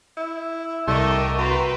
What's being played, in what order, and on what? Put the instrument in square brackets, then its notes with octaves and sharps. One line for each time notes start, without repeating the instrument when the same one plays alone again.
[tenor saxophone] E4
[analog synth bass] C2 [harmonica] D3 A5 C#6 [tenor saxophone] A3 [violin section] A#4 D#5 G5
[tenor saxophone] F#4 [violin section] B4 G5 [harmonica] C5 A#5